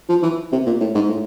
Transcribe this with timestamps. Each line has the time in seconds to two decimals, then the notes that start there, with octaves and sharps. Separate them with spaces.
0.09 F3
0.23 E3
0.52 C3
0.66 A#2
0.80 A2
0.95 G#2
1.09 A2